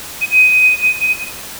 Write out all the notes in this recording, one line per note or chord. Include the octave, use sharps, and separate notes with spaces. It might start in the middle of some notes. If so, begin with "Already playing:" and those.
D#7